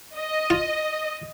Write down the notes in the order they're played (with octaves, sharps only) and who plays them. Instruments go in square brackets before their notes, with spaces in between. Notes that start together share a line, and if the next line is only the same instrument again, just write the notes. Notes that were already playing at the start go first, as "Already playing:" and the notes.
[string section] D#5
[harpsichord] F4